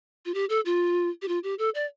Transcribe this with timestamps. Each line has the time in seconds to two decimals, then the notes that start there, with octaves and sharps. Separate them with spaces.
0.25 F4
0.34 G4
0.49 A4
0.65 F4
1.22 G4
1.28 F4
1.44 G4
1.59 A4
1.75 D5